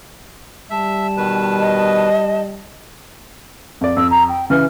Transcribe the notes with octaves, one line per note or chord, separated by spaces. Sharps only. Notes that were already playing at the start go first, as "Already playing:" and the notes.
G3 E5 A5
B2 D#3 B4
D#5
F2 D5
F2 E6
A#5
G5
C#3 E3 F6